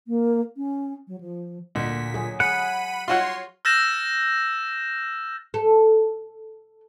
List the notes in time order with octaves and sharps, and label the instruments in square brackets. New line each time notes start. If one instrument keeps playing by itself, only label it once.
[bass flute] A#3
C#4
F#3
F3
[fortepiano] D2 [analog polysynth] A#2 B6
[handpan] F#3 G#4
[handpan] G#4 [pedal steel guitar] F#5 [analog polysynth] B5 D#7
[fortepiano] F4 F#4 F#5 [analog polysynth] C#5 C6
[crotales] E6 F6 G6 A6 A#6 E7
[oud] A4